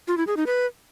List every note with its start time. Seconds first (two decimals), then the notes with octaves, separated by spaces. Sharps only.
0.08 F4
0.17 E4
0.27 G#4
0.37 D#4
0.46 B4